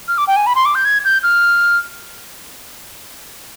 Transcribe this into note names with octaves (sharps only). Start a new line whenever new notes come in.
F6
D6
G5
G#5
B5
C6
D6
G6
G#6
G6
F6